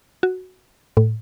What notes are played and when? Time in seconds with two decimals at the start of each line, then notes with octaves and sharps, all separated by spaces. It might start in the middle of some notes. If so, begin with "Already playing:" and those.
0.23 F#4
0.97 A2